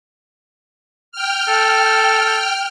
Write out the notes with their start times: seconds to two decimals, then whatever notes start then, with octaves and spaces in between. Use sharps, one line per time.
1.12 G5 F6
1.49 A4